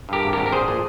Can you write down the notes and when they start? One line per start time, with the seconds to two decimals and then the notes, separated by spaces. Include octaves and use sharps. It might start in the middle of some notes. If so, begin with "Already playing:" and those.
0.09 G2 G4 A#4
0.23 G#1
0.33 G4 A#4
0.38 G#1
0.46 A#4
0.52 A#1 G#4 C5
0.68 A#2